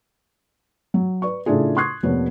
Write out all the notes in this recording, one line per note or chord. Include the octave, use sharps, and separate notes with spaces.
F#3
B4 D5 C#6
A2 C#3 A3 D4 F4 G#4
C6 C#6 D#6 F#6 G#6 C7
F1 F3 A#3 B3 C#5